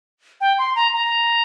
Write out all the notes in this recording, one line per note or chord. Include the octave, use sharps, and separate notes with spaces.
G5
C6
A#5
A#5